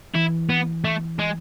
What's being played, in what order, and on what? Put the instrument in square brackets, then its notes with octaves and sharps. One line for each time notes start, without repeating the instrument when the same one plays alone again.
[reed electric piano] E3 [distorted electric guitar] E4
[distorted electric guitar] B3
A3
G#3